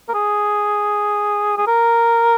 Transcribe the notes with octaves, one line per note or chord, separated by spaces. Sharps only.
A#4
G#4
G#4
A#4